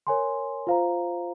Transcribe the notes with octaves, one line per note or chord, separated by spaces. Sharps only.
A#4 C#5 G#5 C6
F4 C5 F5 A#5